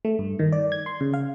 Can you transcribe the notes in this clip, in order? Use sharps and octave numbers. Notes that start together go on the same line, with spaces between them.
A3
G2
D#3
D5
G#6
C6
C#3
F5